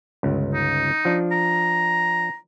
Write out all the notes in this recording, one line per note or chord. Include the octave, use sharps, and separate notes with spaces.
G1 C#2
D#4
F3 D4
A#5